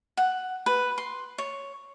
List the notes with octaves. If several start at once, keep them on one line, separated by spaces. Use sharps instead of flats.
F#5
B4
C6
C#5